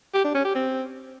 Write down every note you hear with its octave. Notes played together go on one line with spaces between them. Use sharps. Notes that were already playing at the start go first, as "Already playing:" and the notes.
G4
D4
C#4
G4
C4